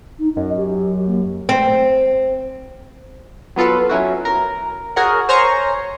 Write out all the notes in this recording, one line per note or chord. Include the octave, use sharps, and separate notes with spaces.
D#4
F#2 D#5
G4
A#3
C4
F#3 B3 F4 A4 B4
F#3 C#4 E4 F#4
A#4
F#4 G#4 A#4 C#5 F#5
C5 C#5 G#5 A#5 C6 C#6